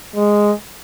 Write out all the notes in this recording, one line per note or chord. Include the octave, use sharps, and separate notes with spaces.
G#3